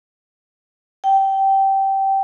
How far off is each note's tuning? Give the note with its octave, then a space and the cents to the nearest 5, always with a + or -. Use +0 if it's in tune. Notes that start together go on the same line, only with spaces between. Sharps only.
G5 -15